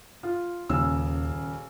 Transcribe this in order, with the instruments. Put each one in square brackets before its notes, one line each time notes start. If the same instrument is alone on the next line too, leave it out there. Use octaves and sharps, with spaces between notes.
[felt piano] F4
[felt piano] D#1 C#3 E6 [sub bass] D#2